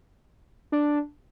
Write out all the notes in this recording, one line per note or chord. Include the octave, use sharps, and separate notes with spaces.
D4